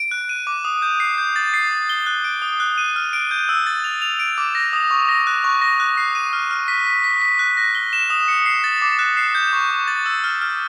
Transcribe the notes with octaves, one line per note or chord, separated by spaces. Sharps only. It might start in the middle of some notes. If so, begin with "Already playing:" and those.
Already playing: D7
F#6
D#7
D6
D#6
G6
C7
G6
A6
C7
A6
G7
F#6
D7
D#6
F#6
D#7
F6
D7
G6
E6
A6
F7
F7
D7
D6
A#6
D#6
C#6
A#6
F#6
C#6
A#6
F#6
C7
D#7
F6
F6
B6
B6
B6
B6
F#6
A#6
G7
E7
D#6
C#7
C7
A6
D6
F#6
C7
G6
C#6
C#6
A6
E6
F6
F6